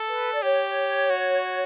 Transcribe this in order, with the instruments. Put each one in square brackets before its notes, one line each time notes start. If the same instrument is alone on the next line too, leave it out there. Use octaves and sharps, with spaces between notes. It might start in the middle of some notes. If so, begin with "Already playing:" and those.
Already playing: [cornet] A4
[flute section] B4
D5
[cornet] G4 [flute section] C#5
[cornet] F#4